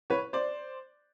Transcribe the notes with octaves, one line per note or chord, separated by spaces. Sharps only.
B4 C#5
C5 D5